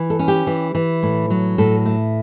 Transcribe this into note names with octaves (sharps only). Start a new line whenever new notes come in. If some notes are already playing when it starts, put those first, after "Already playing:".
Already playing: E3
A4
C#4
G4
E3
E3
A2
F#3
A2 A4
A3